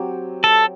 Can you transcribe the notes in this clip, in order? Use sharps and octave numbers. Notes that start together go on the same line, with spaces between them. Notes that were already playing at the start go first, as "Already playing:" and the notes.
Already playing: F#3 C4 G4
A4